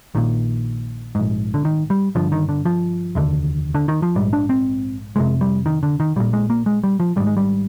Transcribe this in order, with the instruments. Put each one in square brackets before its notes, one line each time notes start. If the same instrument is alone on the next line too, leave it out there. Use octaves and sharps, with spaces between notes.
[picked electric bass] A#1 A#2 D#3
A#1 G#2
D3
D#3
G3
G1 G2 D3 F3
D#3
D3
F3
F1 D#2 D3
D3
D#3
F3
A#1 G#2 G3
D4
C4
F1 F2 C3 G#3
G3
D#3
D3
D#3
A#1 A#2 G3
G#3
A#3
G#3
G3
F3
G#1 G#2 G3
G#3
G3